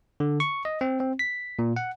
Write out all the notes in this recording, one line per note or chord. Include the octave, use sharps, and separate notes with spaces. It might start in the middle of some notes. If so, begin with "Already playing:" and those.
D3
C#6
D#5
C4
C4
B6
A#2
F#5